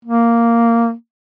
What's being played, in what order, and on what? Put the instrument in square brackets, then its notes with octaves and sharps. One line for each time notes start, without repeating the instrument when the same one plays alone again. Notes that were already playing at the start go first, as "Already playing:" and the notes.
[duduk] A#3